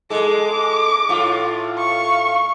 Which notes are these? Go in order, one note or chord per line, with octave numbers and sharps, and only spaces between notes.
G#3 A4 D6
A2 F4
F5 C#6